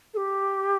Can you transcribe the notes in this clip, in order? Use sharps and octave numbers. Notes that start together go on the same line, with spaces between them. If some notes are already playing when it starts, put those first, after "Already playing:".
A4
G4